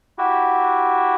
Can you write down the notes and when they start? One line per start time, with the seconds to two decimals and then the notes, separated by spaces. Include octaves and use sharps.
0.18 E4 F#4 G4